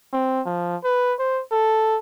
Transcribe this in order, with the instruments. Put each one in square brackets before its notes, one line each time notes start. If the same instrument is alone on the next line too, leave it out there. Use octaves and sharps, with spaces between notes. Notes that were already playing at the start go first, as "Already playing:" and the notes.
[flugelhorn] C4
F3
B4
C5
A4